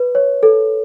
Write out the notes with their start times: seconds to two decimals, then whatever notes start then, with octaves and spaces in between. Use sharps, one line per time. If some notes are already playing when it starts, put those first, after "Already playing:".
Already playing: B4
0.15 C#5
0.43 A4